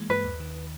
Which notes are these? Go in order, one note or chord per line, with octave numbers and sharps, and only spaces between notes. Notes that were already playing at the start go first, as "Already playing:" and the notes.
Already playing: E3 G#3 A#3
G2 B4
D#2
D#3